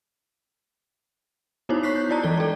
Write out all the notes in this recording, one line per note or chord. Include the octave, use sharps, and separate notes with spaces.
B3 D#4 E4 F#4 C5 C#5
C#6 F#6 B6 C7
G6
E4 F4 D5 A5 A#5
E3 G#3 A4 G7
A4 D5